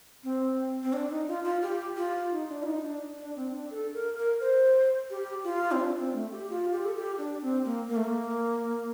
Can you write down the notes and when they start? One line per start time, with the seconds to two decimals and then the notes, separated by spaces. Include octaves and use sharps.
0.24 C4
0.83 C4
0.93 D4
1.10 D#4
1.28 F4
1.44 F4
1.62 G4
1.97 F4
2.31 D#4
2.49 D4
2.63 F4
2.66 D#4
2.84 D4
3.19 D4
3.36 C4
3.53 D4
3.71 A4
3.94 A#4
4.18 A#4
4.40 C5
5.10 G4
5.44 F4
5.72 C4
5.80 D4
5.98 C4
6.14 A3
6.32 G4
6.50 F4
6.72 G4
6.85 A4
6.96 G4
7.18 D4
7.42 C4
7.65 A#3
7.88 A#3
7.96 A3
8.04 A#3